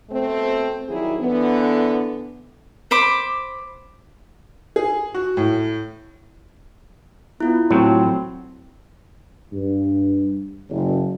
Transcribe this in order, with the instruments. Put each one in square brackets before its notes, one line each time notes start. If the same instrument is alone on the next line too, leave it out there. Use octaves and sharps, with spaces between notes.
[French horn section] B2 A3 C4
D#3 F#3 G3 E4 G#4
D3 E3 B3
[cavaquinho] C5 B5 D6
[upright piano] G#4
F#4
A2
[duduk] B3 [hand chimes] E4 F4
[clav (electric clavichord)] A2 F#3 [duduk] C4
[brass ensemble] G2
F#1